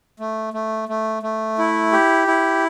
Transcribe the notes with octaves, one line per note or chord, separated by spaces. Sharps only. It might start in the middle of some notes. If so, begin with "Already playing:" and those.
A3
A3
A3
A3
E4
G4
E4